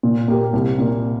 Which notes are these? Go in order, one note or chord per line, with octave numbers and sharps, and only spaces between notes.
A#2
A#3 G4 A#4
C2
A#2 A#3